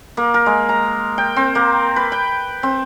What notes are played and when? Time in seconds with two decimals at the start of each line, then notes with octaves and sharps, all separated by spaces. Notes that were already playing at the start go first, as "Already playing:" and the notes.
0.17 A#3
0.34 A#4
0.46 G#3
0.69 A#5
1.18 G5
1.36 C4
1.55 A#3
1.96 B4
2.12 G5
2.63 C4